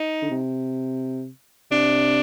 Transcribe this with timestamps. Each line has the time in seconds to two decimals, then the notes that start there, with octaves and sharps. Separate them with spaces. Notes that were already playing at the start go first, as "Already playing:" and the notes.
Already playing: D#4
0.22 D3
0.31 C3
1.71 C3 D4